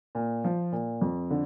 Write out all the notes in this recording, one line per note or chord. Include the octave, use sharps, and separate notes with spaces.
A#2
F3
A#2
F2
D3